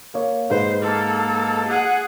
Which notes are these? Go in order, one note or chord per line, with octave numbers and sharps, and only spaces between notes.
A#3 C#5
G#2 B4 C5
A#3 A4
G#4 F#5